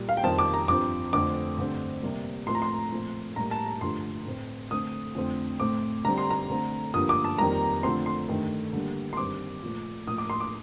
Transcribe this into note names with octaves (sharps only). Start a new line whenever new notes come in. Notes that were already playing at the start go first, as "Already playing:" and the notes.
Already playing: A#2 G3
F5
G5
F2 D#3 G3 C4 A5
D6
A#5
G2 F3 C4 D6
F2 D3 A3 C4 D6
G2 D3 A3 C4
C3 G3 A#3
A2 F3 A3 C4 C6
A#5
C6
A#2 F3 A3 C4
A2 G3 A#3 A#5
A5
A#5
G2 D3 F3 A3 C6
A2 A3 C4
D3 A3 C4 D#6
F2 D3 A3 C4
A2 A3 C4 D6
D3 G3 C4 A#5
C6
A#5
D3 A3 C4
G2 D3 F3 A#3 D#6
D6
A5
F2 D#3 G3 A#3 A#5
D3 F3 A3 C4 C6
C6
G2 D#3 A3
D3 G3 A#3
C6
G2 D#3 G3 C4 D6
A#2 F3 A3
A2 F3 A#3 D#6
D6
C6
D6